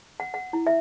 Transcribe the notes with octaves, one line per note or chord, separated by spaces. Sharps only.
F#5
F#5
E4
E5